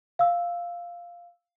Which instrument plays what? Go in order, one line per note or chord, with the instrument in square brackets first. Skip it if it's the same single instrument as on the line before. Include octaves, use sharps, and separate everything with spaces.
[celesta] F5 E6